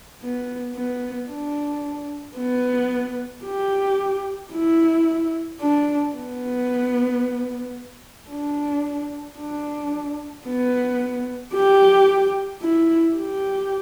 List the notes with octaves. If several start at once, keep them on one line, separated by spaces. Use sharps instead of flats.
B3
B3
D4
B3
G4
E4
D4
B3
D4
D4
B3
G4
E4
G4